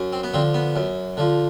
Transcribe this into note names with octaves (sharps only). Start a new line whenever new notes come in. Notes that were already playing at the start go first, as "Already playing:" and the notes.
Already playing: F#2
C4
B3
D3 F3 C4
B3
F#2
D3 F3